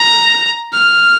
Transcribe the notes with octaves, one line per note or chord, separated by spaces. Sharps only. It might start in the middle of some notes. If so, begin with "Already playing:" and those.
Already playing: A#5
F6